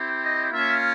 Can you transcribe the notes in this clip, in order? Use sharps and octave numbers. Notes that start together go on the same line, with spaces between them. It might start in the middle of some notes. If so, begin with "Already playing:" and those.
Already playing: C4 E4 G4
D#5
A#3 C#4 F4 E5